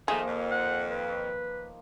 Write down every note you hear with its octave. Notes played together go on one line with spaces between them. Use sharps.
D#3 F3 A3 A#3 D#4 G#4
F2
F#5
B4